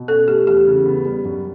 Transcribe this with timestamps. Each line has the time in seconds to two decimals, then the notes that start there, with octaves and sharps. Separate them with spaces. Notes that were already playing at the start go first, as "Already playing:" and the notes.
Already playing: B2
0.08 C#4 A4
0.28 A3 G4
0.47 E2 G4
0.67 C#3
0.86 B3
1.05 G3
1.25 F#2